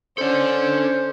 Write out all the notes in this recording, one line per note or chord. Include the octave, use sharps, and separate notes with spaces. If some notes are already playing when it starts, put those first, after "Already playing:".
C#4 A4 C5 D5